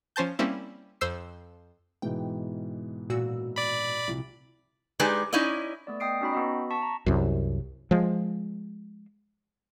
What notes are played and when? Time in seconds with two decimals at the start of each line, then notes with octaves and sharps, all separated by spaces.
0.16 F3 C#4 C5 A5 G6
0.39 G3 A#3 C4 C#4 E4
1.01 F2 C5 E6 C7
2.02 G#2 B2 E3 G5
3.10 A#2 F#4 E6
3.56 D5 B5
4.07 C2 F3
5.00 G#3 D#4 G4 G#4 B4 D5
5.33 C#4 D#4 E4 D5 D#5
5.87 A3 B3 D5
6.00 B3 D#5 G5 D#6 C7 D7
6.21 C#4 D#4 F#4 G5 B5
6.33 B3 F#4 D#5
6.71 A5 C#6 B6
6.82 A#5
7.06 C2 F#2
7.91 F3 G#3